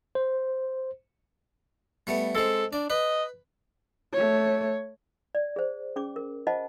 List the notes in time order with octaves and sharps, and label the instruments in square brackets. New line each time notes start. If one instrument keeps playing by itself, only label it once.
[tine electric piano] C5
[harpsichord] G3 A3 B3
[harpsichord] G#3 C4 [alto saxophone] A4
[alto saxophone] D4 [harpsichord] D5
[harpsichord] B4 [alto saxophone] D#5
[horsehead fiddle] A3 C#5
[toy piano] D5
G#4 C5
C#4 G#4 D6
A#4
F4 C5 D#5 F#5 A5